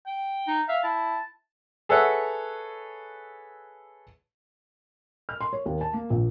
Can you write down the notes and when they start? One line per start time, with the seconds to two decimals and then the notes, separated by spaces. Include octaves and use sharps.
0.07 G5
0.48 D#4
0.69 E5 F5
0.84 E4 A5
1.89 G#4 A4 B4 C#5 E5 F#5
5.29 F6
5.41 C6
5.53 C#5
5.66 D#2
5.81 A5
5.93 A#3
6.10 A#1